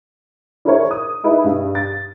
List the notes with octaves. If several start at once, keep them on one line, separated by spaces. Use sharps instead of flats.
D4 E4 G#4 A#4 C5 C#5
D#6
D#4 E4 G#4 B4
G2
A6